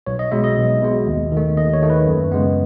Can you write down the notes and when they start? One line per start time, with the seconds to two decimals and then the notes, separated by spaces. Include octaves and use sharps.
0.07 B1 C#5
0.19 D#5
0.32 B2 G#3 E5
0.44 D#5
0.57 B1
0.82 B2 G#3
1.07 D#2
1.32 D#3
1.37 A3
1.57 D#2 D#5
1.73 C#5
1.82 D#3 A3
1.90 B4
2.07 F#2
2.32 C#3 G#3 B3